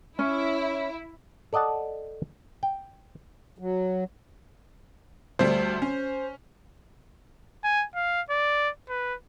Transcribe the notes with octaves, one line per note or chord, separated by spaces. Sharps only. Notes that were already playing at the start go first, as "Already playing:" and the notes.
C#4 E4
A4 D5 D#5 F#5 A5
G5
F#3
D2 G3 A3 C5
C#4
G#5
F5
D5
B4